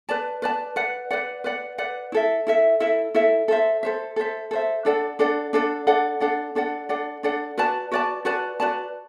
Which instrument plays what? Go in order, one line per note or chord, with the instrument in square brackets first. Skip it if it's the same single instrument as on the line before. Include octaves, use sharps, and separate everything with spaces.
[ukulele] B4 D5 A5
B4 D5 A5
B4 D5 F#5
B4 D5 F#5
B4 D5 F#5
B4 D5 F#5
E4 A4 E5
E4 A4 E5
E4 A4 E5
E4 A4 E5
A4 C5 E5
A4 C5 E5
A4 C5 E5
A4 C5 E5
D4 A4 D5 F#5
D4 A4 D5 F#5
D4 A4 D5 F#5
D4 A4 D5 F#5
D4 A4 D5 F#5
D4 A4 D5 F#5
D4 A4 D5 F#5
D4 A4 D5 F#5
F#4 B4 D5 A5
F#4 B4 D5 A5
F#4 B4 D5 A5
F#4 B4 D5 A5